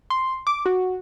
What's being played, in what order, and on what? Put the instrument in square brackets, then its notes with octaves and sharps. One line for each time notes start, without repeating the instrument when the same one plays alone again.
[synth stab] C6
D6
F#4